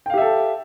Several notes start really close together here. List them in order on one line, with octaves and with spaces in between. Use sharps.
G5 F5 G4 E5 A4